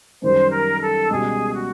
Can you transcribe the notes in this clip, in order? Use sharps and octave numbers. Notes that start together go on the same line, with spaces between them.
F#2 D#3 G3 C5
A#4
A4
C#2 B2 G3 G#4
F#4